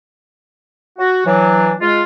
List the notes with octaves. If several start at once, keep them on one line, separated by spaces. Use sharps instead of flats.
F#4
E3 F#3 D4
G#3 F4